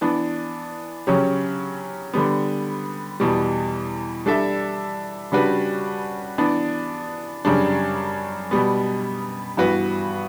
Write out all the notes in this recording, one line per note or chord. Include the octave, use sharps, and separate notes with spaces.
E3 B3 D4
C#3 F#3 C#4 G4
D3 G3 B3
E2 B2 G3
G3 D4 A4 E5
C#3 G3 D4 F#4 B4
E3 B3 D4
F#2 C#3 G3 D4
B2 G3 B3
G2 E3 B3 F#4 B4